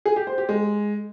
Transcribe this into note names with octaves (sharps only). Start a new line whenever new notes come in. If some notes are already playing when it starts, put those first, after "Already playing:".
G#4
G4
C5
G4
G#3